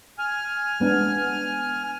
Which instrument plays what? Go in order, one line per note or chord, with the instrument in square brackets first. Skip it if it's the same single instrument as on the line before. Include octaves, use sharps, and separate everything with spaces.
[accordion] G#5 F6
[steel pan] G#3 B3 D4